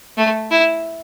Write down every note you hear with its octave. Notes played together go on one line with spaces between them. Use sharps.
A3
E4